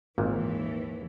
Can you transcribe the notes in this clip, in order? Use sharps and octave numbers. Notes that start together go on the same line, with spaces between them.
G#1 D#2 A#2 E3